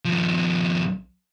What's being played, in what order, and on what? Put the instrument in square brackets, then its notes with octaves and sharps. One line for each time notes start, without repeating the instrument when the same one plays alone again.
[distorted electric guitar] D#2 F3